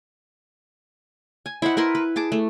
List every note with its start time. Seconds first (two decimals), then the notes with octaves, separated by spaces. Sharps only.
1.46 G#5
1.62 E4 C5 D#5 F#5
1.77 E4 A#4 B4 C6
1.95 B4
2.16 G#4 A5 D6
2.32 A3